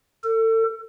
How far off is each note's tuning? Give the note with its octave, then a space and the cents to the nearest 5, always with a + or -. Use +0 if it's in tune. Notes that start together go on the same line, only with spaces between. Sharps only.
A4 +35